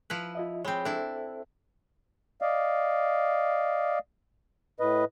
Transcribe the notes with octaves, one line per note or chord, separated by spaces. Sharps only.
F3 E4 B4
F4 D#5 E5
G#3 C4 C#5 B5
D4 E4 A4 C5 E5
D5 D#5 F5
A2 B4 D#5